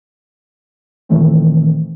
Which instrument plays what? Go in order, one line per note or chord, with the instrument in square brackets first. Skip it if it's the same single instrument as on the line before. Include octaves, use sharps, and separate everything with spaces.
[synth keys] A#2 D#3 E3 A3 C4